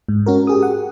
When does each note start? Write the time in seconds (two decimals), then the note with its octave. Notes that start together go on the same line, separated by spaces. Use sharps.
0.09 G#2
0.26 C#4 F#4 A#4
0.47 G4 G#4 D#6
0.63 F#5